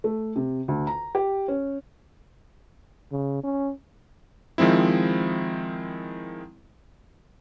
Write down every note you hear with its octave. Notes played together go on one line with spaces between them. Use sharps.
A3
C3
D2
A#5
G4
C#4
C#3
C#4
D#3 F3 G#3 C4 E4